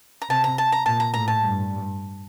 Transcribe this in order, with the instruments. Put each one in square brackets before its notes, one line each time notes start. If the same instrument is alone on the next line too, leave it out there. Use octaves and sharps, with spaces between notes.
[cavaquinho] A#5
[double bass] C3 [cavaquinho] A5
[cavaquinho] A#5
A5
A#5
[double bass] A#2 [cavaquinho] A5
[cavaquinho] A#5
[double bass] A2 [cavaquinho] A#5
[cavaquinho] A5
[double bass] G2